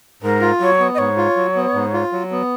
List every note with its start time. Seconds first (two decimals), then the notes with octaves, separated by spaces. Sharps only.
0.22 G#2 A#4
0.41 F4
0.60 F#3 C#5
0.79 B3
0.94 D#5
0.98 G#2 C#5
1.17 F4
1.36 F#3
1.56 B3
1.74 G#2
1.93 F4
2.12 F#3
2.32 B3